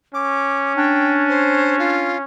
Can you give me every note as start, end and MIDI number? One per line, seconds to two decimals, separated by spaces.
0.14 2.25 61
0.14 0.73 86
0.76 2.22 62
0.76 1.13 79
1.29 1.77 72
1.79 2.17 65